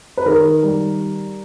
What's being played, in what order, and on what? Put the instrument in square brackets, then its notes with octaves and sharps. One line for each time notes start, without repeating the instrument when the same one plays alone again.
[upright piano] B4
D#3 A#4
G3